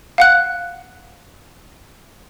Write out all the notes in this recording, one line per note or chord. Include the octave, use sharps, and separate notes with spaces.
F5 F#5 F#6